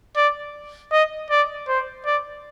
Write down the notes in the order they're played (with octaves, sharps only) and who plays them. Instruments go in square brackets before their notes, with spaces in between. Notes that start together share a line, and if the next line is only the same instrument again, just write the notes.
[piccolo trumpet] D5
D#5
D5
C5
D5